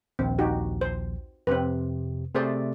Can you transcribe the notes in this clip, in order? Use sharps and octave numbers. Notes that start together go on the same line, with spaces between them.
A#1 D#2 C4
D#4 F#4 G4
C5
F2 C3 C4 B4
C3 A3 G#4 C5 D5